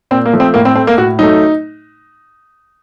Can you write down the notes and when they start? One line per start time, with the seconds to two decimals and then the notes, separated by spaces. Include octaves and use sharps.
0.11 A#2 C4
0.26 A#3
0.33 F3 A3
0.40 C4
0.54 A2 A#3
0.65 C4
0.75 A3 C4
0.87 A#3
0.97 A2 F#4
1.19 F#3 A3 D#4